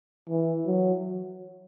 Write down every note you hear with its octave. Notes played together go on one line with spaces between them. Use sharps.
E3
F#3